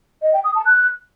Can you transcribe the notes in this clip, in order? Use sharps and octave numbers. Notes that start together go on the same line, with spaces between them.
D#5
G5
D#6
A5
F#6